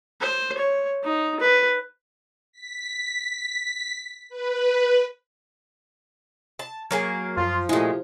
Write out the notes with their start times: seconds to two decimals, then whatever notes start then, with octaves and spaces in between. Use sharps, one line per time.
0.21 C5
0.57 C#5
1.04 D#4
1.40 B4
2.52 B6
4.29 B4
6.59 A5
6.91 F#3 A#3 G#4 C#5 F6
7.37 F#2 F3 F4
7.69 A#2 G#3 A3 E4 G4 G#4